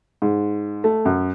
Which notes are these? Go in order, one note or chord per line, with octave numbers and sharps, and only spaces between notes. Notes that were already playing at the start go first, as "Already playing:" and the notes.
G#2
A3
F#2